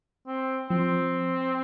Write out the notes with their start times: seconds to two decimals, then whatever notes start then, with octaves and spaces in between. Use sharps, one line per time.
0.27 C4
0.70 F3 C4